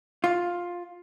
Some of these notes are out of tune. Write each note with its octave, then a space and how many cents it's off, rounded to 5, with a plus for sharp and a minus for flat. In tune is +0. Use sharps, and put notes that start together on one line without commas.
F4 +10